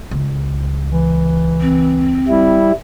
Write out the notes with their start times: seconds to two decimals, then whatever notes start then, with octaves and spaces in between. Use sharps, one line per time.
0.11 C#2
0.92 E3
1.61 C4
2.28 G3 E4